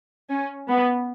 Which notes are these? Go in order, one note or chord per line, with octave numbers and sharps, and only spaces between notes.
C#4
B3